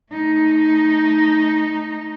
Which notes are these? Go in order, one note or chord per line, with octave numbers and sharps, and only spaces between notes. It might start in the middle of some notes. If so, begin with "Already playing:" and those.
A3 D#4